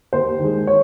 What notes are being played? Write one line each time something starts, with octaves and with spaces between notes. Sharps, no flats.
D#2 C5
D#3 G#3
C#5